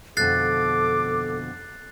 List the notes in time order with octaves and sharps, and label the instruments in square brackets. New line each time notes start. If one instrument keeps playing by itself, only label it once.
[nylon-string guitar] F2 B2 D3 [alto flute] A4 [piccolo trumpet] D6 [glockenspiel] F#6 A6 C7